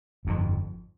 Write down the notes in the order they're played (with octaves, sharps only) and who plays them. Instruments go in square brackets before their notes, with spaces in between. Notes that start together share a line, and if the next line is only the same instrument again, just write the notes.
[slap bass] G1 F2 F3